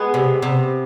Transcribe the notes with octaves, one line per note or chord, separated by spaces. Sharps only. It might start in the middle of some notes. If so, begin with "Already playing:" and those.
Already playing: G#3 B3
C3
C3